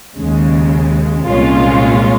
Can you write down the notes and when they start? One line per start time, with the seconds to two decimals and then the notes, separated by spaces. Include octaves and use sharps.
0.16 D#2 C#3 G#3
1.25 C2 A#2 G#3 C#4 F4